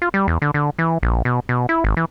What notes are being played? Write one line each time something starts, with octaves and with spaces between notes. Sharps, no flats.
F4
G3
E2
D3
D3
E3
A#1
B2
B2
E4
G#1
E3